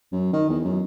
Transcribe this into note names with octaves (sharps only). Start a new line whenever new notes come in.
F#2
D#3
E2
F#2